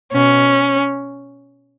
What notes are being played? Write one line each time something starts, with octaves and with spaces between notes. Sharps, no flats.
B2 C#4